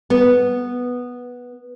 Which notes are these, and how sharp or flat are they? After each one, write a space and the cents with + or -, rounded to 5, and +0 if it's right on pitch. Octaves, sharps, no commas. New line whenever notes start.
B3 -5